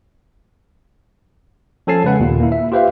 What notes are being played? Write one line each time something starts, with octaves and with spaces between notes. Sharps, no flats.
F3 C#4 A4 G#5 A5 C7
C#3 G#3 B4 F#5
D#2 A#2
A#3 E4
E5
F4 G4 B4 C5 E5 F5